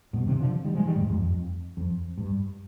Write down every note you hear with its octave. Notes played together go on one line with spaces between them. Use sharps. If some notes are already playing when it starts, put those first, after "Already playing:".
G2 B2
C3 D#3
D3 F3
D#3 G3
F3 G#3
D#3 G3
F2 G#2
F2 G#2
F2
F2
G2